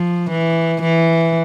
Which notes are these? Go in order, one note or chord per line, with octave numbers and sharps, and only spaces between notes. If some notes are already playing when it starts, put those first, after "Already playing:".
Already playing: F3
E3
E3